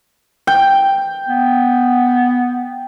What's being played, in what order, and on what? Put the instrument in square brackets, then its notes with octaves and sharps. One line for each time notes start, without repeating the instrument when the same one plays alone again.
[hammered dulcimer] G5
[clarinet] B3